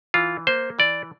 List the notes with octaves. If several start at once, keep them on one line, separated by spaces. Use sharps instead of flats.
E3 F4
A#3 C5
E3 D5